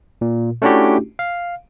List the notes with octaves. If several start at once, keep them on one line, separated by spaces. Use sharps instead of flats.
A#2
A3 C#4 D4 E4 F#4 G4
F5